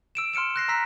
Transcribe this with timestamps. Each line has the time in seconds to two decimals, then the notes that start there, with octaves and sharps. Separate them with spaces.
0.15 E6 D7 E7
0.33 C6 F6 C#7 D7 E7
0.56 F#6 A#6 C7
0.68 A#5 E6 B6 C7